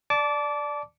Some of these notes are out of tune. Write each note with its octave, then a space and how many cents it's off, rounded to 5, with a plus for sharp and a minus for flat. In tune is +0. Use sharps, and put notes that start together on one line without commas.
D5 +0 A5 -15 D6 -20